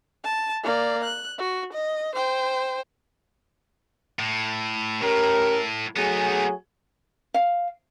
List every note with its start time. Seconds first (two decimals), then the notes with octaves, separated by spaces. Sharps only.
0.24 A5
0.64 A#3 D5
1.04 F#6
1.38 F#4
1.73 D#5
2.15 C5 G5
4.19 A2
5.02 A2 C#4 G4 A#4
5.96 F#3 A3 B3 D#4 G#4
7.34 F5